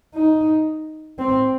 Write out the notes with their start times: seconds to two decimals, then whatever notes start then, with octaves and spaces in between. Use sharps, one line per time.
0.15 D#4
1.19 C4